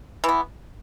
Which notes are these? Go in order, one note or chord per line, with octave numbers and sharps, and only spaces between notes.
E3 B3